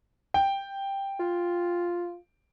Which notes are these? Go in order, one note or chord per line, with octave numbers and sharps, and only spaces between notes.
G5
F4